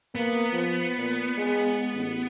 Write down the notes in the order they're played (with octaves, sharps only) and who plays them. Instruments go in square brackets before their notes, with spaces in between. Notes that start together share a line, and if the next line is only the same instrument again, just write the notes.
[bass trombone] A#3 [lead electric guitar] B3
[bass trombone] F3
A#2
G#3
A1